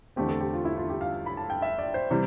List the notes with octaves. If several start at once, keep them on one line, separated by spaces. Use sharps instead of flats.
E2 D3 A3 C4 G4
A4
G4
F4
E4
F4
G4
F5
B5
A5
G5
E5
D5
C5
C3 E3 G3